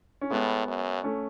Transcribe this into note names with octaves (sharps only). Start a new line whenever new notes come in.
C#4
A2 G#3 B3
F#2
A3 C#4